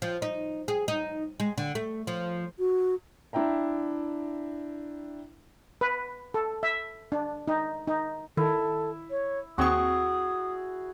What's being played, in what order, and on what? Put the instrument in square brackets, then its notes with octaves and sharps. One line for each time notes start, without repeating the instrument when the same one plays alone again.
[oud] F3
D#4
G#4
D#4
G#3
D3
A3
F3
[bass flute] F#4
[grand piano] D4 E4 E5 G5 A#5
[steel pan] B4
A4
E5
D4
D#4
D#4
[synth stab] D#3 [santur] E4 [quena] A4
[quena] C#5
[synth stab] D#2 C4 C#6 [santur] F#4 G#4 [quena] D#6